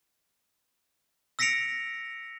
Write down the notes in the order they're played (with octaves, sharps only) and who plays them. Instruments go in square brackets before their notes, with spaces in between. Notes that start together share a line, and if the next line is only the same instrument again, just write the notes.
[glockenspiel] E6 A#6 B6 C#7 D7 F7